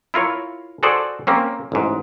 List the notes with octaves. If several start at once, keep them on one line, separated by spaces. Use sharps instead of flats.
E4 F4 A#4 C#5
F#4 G#4 A4 C5 D5
A#3 C4 C#4
A1 G#2